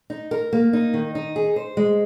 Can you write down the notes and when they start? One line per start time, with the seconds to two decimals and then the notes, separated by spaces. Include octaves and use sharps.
0.10 D#4
0.31 A#4
0.53 A#3
0.73 D#4
0.94 D#3
1.15 D#4
1.36 G#4
1.56 C5
1.77 G#3